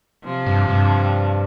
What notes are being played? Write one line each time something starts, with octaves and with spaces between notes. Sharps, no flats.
C3 F3
G2
G2